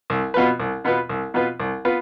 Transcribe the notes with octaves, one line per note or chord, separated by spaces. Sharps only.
C2
B2 B3 F4 B4
C2
B2 B3 F4 B4
C2
B2 B3 F4 B4
C2
B3 F4 B4